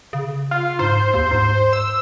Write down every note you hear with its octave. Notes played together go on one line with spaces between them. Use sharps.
C#3
F4
G#2 C5
D#2
G#2
E6